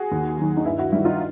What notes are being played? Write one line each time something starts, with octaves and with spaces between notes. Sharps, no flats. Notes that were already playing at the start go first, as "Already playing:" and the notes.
Already playing: F#4 G#4
D#2
D#3 F#3
D#4
G2 E4
E4 F#4
D#3 G3 E4
D#4 F4